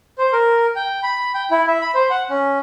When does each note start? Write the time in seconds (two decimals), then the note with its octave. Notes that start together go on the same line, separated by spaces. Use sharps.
0.18 C5
0.33 A#4
0.76 G5
1.03 B5
1.35 G5
1.51 E4
1.68 E5
1.81 B5
1.95 C5
2.10 F#5
2.30 C#4